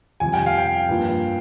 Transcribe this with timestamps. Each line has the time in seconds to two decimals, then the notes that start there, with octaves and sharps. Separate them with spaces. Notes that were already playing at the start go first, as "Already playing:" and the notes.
0.20 F2 C3 G3 G#5
0.34 G5
0.46 F5
0.57 G5
0.89 G2 F3 A#3 F4